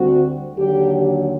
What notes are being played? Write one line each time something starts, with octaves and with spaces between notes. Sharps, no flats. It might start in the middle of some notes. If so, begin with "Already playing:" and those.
Already playing: D2 D3 G3 C4 F#4
D#2 D3 F#3 G4